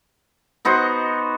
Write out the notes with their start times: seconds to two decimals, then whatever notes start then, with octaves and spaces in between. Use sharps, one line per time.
0.65 B3 D#4 F#4 C5